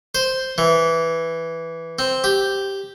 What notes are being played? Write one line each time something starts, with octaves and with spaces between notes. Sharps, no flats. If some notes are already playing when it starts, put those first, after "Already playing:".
C5
E3
C4
G4